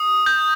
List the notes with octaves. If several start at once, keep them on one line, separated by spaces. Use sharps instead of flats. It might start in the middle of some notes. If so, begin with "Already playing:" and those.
Already playing: D#6
G6